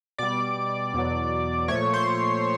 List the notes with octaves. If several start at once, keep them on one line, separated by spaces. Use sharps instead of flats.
B2 G3 D5 D6
E2 B2 F#3
A#2 F3 A3 C#5 C#6
C5 C6